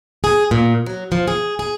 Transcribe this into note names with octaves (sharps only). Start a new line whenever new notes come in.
G#4
A#2
F#3
F3
G#4
G#4